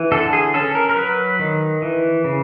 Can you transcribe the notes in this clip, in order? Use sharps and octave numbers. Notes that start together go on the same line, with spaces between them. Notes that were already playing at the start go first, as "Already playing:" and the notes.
Already playing: E3
D3 A4
G#4
C#4 A4
A#4
A#4
F#3 B4
D#3
E3
C#3